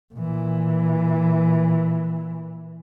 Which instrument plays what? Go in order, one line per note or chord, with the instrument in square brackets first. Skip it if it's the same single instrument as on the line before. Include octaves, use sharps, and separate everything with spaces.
[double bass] A#2 E3